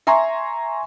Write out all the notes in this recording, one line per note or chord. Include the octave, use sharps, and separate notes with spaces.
E5 G#5 A#5 C6 C#6